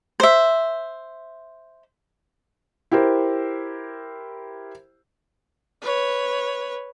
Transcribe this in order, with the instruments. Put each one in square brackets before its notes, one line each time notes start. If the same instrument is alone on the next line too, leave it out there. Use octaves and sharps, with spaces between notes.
[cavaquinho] C5 E5
[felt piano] E4 G4 A#4 C5
[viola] B4 C#5